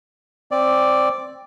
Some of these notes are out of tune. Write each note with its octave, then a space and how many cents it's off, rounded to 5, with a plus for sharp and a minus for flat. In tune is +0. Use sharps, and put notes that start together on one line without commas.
C4 +10 D5 +0